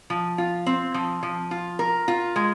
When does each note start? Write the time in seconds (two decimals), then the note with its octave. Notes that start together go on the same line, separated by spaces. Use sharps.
0.10 F3
0.38 F4
0.66 C4
0.94 F3
1.23 F3
1.51 F4
1.79 A#4
2.08 F4
2.36 G#3